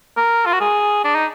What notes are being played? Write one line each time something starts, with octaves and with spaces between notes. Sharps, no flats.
A#4
F4
F#4
G#4
D4
D#4